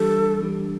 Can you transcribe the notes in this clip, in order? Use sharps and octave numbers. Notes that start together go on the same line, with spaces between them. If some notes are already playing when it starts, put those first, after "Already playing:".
Already playing: E3 G3 D4 G4 A4
E3 G3 D4 G4